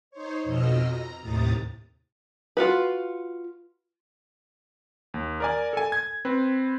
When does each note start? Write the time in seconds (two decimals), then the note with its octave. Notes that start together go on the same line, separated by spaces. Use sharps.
0.11 D#4 C5 C#5
0.44 F2 B2 D#5 E6 F6
0.80 A#5
1.21 D#2 A2 C3 A#5 D#6 A6
2.57 F4 F#4 B4
5.14 D#2
5.40 A#4 D5 G#5
5.73 A4 G#5
5.92 G#6
6.25 C4 B4